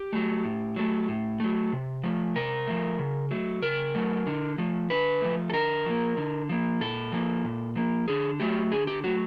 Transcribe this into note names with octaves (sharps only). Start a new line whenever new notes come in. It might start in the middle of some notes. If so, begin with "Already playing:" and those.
Already playing: G4
F#3 A3
A2
F#3 A3
A2
F#3 A3
C3
F3 A3
C3 A#4
F3 A3
C#3
F#3 A3
C#3 A#4
F#3 A3
D3
F3 A3
D3 B4
F3 A3
A4
D3 A#4
F3 A#3
D3
F3 A#3
A#2 A4
F3 A#3
A#2
F3 A#3
D3 G#4
F#3 A3 G4
D3 G#4
G4
F#3 A3 F#4